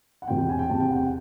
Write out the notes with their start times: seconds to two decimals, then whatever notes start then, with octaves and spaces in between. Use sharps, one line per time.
0.22 F#5
0.27 E1 E2 C3 G5
0.38 G5
0.49 G#5
0.59 G5
0.70 E1 E2 C3 A5
0.80 G5
0.91 F#5
0.96 G5
1.01 F#5